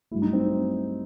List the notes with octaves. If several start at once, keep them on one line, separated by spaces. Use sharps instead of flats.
G2 F#3 A3 E4
D#4
C4